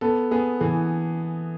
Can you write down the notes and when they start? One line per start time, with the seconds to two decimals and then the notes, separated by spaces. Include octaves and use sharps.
0.01 B3 A4
0.31 B3 G#4
0.61 E3 G#4